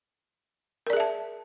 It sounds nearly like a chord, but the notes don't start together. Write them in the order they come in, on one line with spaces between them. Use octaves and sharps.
A#4 D5 G#4 E5 A5